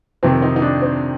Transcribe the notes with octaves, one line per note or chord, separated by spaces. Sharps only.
F2 C3 D#3 C4
D#4
D#4
D4
C4